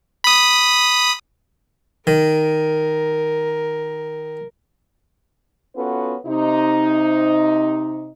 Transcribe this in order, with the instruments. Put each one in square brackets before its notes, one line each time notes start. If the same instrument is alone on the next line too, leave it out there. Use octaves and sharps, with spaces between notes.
[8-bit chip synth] B5 D#6
[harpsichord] D#3 [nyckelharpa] A#4
[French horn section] B3 C#4 F4 F#4 A4 B4
C3 D#4